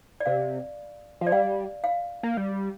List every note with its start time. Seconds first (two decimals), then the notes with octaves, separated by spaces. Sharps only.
0.20 D5
0.26 C3 F5
1.21 F3
1.27 D5
1.32 G3 F5
1.84 F5
2.23 A#3
2.37 G3